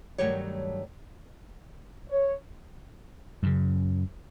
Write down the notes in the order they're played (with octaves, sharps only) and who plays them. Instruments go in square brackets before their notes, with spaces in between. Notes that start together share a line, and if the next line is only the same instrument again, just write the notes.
[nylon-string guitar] G2 D#3 F#3 A3 G4 C#5
[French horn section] C#5
[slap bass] F#2 C#3